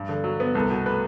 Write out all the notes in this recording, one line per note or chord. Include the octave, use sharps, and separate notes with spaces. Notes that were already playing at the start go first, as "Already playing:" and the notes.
Already playing: G2
D3
F#3
B3
C2 A4
B2
A3 B4